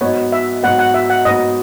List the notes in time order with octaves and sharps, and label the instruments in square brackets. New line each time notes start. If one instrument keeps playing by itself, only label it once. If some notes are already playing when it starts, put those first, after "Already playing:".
[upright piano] G#2 F#3 B3 [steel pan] C#5
[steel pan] E5
[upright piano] G#2 F#3 B3 [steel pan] F#5
[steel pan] F#5
E5
F#5
[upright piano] G#2 F#3 B3 [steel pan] D#5